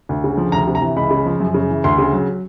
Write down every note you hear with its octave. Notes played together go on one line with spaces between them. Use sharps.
D2
C#3
F3
D2 A#5
C3
A#5
E3
C#2 B5
C#3
F3
F#2
C#3
E3
D2 C6
C#3
F#3